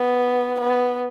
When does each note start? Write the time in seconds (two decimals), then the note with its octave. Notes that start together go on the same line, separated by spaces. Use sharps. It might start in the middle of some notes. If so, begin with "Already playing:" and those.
Already playing: B3
0.60 B3